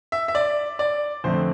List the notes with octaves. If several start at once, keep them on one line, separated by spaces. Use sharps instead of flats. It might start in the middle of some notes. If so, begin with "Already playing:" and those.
E5
E5
D5
D5
F2 D3 A3 C4 C5